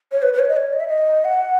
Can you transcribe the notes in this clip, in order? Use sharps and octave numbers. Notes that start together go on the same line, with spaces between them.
C#5
B4
B4
C#5
D#5
C#5
D#5
E5
D#5
F#5